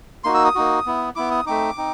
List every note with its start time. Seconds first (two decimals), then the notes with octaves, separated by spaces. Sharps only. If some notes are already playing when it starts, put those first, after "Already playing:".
0.24 A#3 D#4 F#4 C6
0.34 E6
0.45 D#6
0.55 A#3 D#4 F#4
0.86 B3 E4
1.16 B3 E4 D6
1.31 D#6
1.46 A3 C4 D#4 D6
1.78 C4 D#4